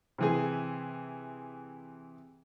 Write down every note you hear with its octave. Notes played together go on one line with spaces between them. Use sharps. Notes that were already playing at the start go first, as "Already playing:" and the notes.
C3 E3 G#4